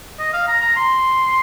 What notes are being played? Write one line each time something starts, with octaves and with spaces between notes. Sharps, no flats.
D#5
F5
A#5
A#5
C6